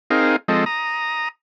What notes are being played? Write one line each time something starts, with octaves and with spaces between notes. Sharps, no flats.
C4 D#4 G#4 A#4 F5
F3 G#3 C4 A4 D#5
A#5 D#6